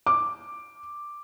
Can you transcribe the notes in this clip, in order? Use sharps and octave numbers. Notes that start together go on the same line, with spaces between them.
D6